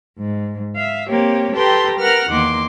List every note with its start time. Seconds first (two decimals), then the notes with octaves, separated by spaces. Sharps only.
0.18 G#2
0.75 E5 F5
1.09 A#3 C4 G4 C#5
1.54 G4 A4 B4 G5 A#5 C6
1.98 A#4 B4 F#5 F6
2.29 E2 D#3 A#3 C6 D6